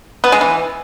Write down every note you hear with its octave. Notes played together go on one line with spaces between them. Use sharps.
B3
G#3
E3